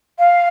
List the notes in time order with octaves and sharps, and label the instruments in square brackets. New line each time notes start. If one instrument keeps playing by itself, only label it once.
[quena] F5